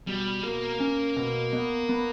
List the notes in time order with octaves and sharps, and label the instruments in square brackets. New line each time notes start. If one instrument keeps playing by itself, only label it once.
[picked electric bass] B2 [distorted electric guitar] G3
[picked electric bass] B2 [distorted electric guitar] A#3
[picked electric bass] C#4
B2
B3
B3